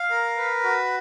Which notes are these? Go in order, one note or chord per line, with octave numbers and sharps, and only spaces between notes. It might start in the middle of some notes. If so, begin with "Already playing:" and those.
Already playing: F5
A#4
B4
F#4